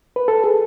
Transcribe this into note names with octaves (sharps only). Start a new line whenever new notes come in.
B4
A4
G#4